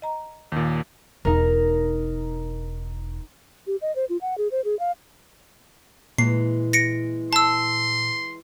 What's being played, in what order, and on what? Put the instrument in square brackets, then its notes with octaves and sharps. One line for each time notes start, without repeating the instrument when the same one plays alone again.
[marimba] D#5 A#5
[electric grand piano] D#2 A#2 [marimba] D#3
[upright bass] E1 [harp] D#4 A#4
[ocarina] G4
D#5
C5
F4
F#5
G#4
C5
G#4
F5
[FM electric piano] A#2 [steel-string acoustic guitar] E3 G#3 [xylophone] C7
[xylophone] A#6 C#7 D7
[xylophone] A5 E6 [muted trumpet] C6